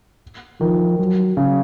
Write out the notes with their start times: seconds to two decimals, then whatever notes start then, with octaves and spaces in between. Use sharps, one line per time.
0.61 D#3 F3
0.99 F#3
1.37 C#3